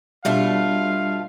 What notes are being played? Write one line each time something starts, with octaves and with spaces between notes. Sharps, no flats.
B2 G3 A3 D4 F4 F5